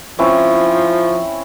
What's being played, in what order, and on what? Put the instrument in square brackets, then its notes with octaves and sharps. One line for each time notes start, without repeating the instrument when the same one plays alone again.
[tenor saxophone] F3 [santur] C4 C#4 E4